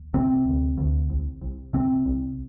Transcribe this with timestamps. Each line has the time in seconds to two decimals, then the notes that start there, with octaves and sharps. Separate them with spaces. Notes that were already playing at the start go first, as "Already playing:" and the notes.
Already playing: D#2
0.13 C2 C3 C4
0.45 D2
0.78 D2
1.10 C2
1.41 C2
1.73 C2 C3 C4
2.05 C2